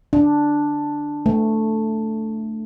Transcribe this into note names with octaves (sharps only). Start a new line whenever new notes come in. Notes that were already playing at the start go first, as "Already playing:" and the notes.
D4
A3